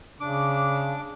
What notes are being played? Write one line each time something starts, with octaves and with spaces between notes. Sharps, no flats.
C#3 D4 D6